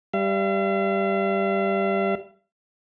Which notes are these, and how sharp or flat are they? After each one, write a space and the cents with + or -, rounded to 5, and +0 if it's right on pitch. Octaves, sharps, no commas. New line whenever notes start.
G3 +0 F5 -45